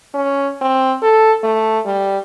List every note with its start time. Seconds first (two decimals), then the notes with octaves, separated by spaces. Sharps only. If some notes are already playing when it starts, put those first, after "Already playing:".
0.14 C#4
0.61 C4
1.02 A4
1.43 A3
1.85 G3